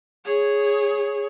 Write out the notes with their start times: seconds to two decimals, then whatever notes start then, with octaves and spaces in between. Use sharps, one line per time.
0.25 G#4 C#5